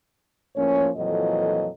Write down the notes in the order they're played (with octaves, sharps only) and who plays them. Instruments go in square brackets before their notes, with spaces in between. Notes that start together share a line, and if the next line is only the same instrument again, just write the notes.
[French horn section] A2 F3 A#3 C#4 C#5
F2 A#2 E3 F#3 A4 D#5